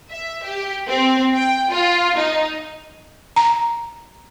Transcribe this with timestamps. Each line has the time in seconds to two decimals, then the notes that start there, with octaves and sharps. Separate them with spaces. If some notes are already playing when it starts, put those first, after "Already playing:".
0.10 E5
0.44 G4
0.86 C4
1.34 G5
1.70 F4
2.16 D#4
3.36 A#5